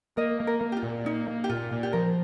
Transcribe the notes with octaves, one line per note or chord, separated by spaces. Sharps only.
A#3 A#4 D#5
A#3
A#4
A#3
G4
F4
A#2
A#3 D#4
A#3
G4
A#2 F4
A#2
G4
F3 A#4